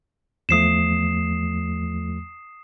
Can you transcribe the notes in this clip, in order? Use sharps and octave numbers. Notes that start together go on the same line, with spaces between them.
E2 F3 A3 D#6 C7 E7